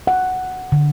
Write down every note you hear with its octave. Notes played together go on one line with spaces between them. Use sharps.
F#5
D3